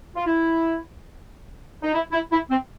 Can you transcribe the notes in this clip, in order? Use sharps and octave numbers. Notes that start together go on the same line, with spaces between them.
F4
E4
D#4
E4
E4
E4
C4